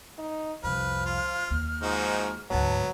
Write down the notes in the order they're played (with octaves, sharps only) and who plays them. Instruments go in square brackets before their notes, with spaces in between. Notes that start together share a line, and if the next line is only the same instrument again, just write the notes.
[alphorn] D#4
[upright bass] C2 F2 [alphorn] F3 [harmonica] B4 [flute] F6
[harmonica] F4
[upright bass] D#2
[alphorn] G#2 [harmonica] F3 D#4 F#4
[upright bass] D2 G#2 [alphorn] F#3 [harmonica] B3 [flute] A5